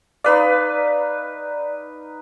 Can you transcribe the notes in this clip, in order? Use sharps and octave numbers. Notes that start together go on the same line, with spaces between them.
D#4 B4 D5 F5